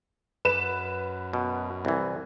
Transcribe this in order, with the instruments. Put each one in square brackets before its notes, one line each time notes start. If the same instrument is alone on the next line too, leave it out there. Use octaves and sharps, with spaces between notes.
[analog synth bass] F#2 [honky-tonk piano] B4 E7
[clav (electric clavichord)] B2
C2 E3